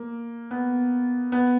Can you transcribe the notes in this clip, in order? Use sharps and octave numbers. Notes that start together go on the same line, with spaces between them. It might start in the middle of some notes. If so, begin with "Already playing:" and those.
Already playing: A#3
B3
B3